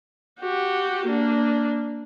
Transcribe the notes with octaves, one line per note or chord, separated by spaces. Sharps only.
F#4 G4
A#3 D4